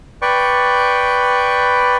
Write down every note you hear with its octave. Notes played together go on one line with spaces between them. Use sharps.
B4 D5 G5 C#6